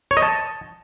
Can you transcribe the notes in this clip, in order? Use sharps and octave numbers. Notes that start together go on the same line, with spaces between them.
C#5
D#5
A5